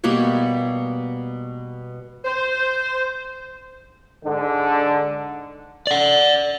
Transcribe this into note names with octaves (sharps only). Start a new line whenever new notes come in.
B2 G3 A#3 C#5
C5
G#2 D3
D5 F#5